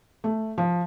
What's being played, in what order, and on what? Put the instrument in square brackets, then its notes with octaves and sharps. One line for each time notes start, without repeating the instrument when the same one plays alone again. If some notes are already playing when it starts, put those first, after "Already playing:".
[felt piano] A3
F3